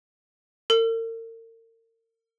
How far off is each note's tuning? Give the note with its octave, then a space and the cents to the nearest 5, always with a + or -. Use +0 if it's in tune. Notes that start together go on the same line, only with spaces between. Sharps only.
A#4 -40